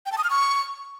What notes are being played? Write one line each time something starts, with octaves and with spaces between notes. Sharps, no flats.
G5
A5
D#6
F6
C#6